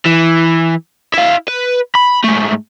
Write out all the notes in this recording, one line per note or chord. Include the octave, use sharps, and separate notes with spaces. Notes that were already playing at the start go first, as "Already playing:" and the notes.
E3
E4 F5
B4
B5
G#2 A3